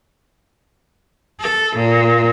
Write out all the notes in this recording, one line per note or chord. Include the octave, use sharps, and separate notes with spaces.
A4
A#2